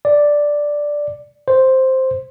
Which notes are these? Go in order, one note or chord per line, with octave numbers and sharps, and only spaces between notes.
D5
C5